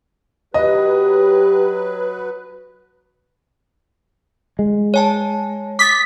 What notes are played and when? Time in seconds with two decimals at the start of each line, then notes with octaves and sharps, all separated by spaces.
0.54 F#3 G4 B4 D#5
4.59 G#3
4.94 C#5 G#5 A5
5.79 D6 D#6 A6 B6